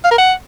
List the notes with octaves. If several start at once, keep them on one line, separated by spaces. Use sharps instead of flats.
F5
A#4
F#5